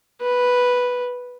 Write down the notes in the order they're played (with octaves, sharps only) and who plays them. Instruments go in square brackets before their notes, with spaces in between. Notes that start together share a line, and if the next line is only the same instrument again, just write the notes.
[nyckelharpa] B4